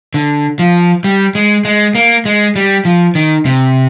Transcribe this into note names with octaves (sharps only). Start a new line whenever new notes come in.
D3
F3
G3
G#3
G#3
A#3
G#3
G3
F3
D#3
C3